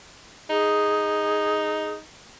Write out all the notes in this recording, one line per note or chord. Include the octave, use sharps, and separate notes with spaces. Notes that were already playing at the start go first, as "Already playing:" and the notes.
D#4 G#4